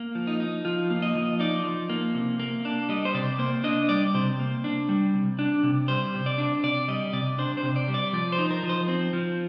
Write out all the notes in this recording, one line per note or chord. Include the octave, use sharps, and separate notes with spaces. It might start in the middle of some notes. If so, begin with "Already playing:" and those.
Already playing: A#3
F3
D#4
D#4
F3 F4
A#3
D#5
F3
D#4 D5
F3
A#3
C3
A#3
D4
G3 D#5
C5
C3 D5
A#3 C5
D4 D#5
G3 D5
C3 C5
A#3
D4
G3
C3
D4
C3
G3 C5
C3
D5
D4
C3 D5
G3 D#5
C3 D5
D4 C5
C5
C3
D5
G3
D5
F3 D5
C5
D#4
A#4
F3
C5
C4
F3